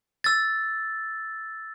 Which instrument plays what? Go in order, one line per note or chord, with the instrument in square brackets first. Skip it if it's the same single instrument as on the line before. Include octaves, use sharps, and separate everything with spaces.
[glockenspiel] E6 A6